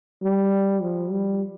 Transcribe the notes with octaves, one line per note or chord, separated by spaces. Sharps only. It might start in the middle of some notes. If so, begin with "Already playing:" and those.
G3
F3
G3